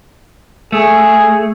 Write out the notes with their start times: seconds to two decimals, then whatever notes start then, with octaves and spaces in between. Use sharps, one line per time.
0.72 A3 G#4